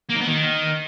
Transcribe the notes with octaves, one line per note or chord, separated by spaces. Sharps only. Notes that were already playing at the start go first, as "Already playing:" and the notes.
A#3
D#4
B3
D#3